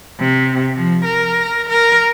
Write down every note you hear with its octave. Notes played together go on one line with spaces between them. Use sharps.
C3
F3
A#4
A#4